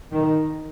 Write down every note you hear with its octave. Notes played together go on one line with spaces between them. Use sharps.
D#3